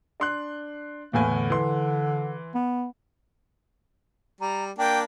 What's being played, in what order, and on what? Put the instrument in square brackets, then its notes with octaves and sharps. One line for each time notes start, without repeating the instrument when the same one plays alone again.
[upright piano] D4 C6 F#6
[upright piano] E2 A2 G#5 [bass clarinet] A#3
[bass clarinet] D3
[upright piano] E3 C6
[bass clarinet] B3
[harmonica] G3 [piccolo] A#5
[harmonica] A#3 D4 [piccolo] G5